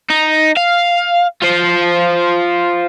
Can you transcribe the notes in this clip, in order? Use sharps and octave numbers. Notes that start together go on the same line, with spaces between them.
D#4
F5
F4 C5